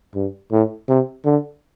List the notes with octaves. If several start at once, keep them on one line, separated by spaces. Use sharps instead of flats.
G2
A2
C3
D3